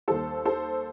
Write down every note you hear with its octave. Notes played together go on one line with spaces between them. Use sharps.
D#2 D#3 G3 A4 C5
A4 C5